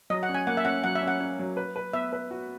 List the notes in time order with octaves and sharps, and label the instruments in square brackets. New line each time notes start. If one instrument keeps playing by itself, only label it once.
[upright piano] F#3 [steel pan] D#5
[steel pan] F#5
[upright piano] C#4
[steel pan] G#5
[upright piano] A#3 [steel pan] F#5
[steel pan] E5
[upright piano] C#4 [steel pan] F#5
[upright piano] F#3 [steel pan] F#5
[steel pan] E5
[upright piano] C#4
[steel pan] F#5
[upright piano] C#4
F#3
B4
B4
[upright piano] B3 [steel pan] E5
[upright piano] B4
F#4